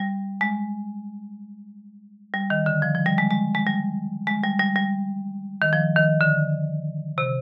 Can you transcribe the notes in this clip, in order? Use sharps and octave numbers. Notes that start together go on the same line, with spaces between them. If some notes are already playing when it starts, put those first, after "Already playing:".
Already playing: G3
G#3
G3
D#3
D3
F3
F3
G3
G#3
G#3
G#3
G3
G#3
G3
G3
G3
D#3
F3
D#3
D3
C3